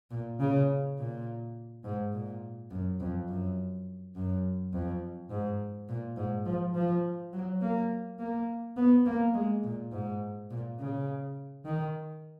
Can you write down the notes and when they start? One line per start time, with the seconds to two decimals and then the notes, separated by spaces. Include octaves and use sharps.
0.11 A#2
0.40 C#3
0.98 A#2
1.84 G#2
2.13 A#2
2.71 F#2
3.00 F2
3.29 F#2
4.15 F#2
4.73 F2
5.30 G#2
5.89 A#2
6.16 G#2
6.46 F3
6.75 F3
7.33 F#3
7.62 A#3
8.19 A#3
8.77 B3
9.06 A#3
9.34 G#3
9.64 A#2
9.92 G#2
10.50 A#2
10.80 C#3
11.65 D#3